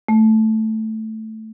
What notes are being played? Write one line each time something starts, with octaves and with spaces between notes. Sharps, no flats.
A3